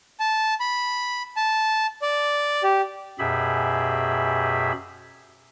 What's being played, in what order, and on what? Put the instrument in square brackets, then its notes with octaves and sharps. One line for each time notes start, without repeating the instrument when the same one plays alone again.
[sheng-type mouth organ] A5
B5
A5
D5
G4
[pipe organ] F#2 B2 G4 G#4 E5 B5